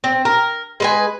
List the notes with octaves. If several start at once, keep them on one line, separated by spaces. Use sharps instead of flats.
C4
A#4
G#3 B4 G#5